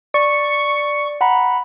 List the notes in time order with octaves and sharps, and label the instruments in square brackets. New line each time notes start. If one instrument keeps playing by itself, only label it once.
[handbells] D5 [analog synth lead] C#6
[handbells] F#5 A#5 B5